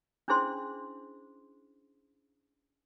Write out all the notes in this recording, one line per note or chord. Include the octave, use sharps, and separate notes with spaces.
C#4 D4 E4 G#4 C5 C6